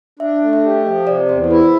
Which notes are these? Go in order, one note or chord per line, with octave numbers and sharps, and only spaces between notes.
D4 E5
A3
E5
G4
F3 D#5
C3 D5
E2 C5
C5
E4 B4